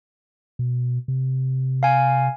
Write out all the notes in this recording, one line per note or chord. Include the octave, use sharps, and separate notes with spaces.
B2
C3
F5 G#5